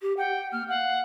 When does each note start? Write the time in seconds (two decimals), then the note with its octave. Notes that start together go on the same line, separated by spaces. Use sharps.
0.02 G4
0.17 F#5 G5
0.52 A#3 F6
0.69 F5 F#5